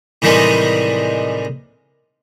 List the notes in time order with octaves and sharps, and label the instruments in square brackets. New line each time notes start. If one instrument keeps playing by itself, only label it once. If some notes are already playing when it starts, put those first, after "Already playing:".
[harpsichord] A2 C3 D#3 E3 G3 G#3